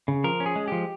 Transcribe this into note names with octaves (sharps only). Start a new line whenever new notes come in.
C#3
F3 A#4
C#4
G#4
G#3
F3 G4